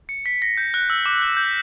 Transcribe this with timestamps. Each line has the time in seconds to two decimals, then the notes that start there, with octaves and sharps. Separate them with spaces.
0.09 C#7
0.26 B6
0.42 A#6
0.57 G6
0.74 F#6
0.90 E6
1.06 D6
1.22 F#6
1.37 G6
1.45 B6